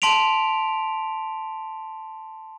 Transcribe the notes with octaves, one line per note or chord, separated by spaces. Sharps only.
A5 C6 B6 D7 F7